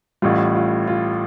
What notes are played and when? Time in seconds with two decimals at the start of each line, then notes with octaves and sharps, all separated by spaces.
0.22 A1 A2 G3 F4
0.55 F4
0.87 F4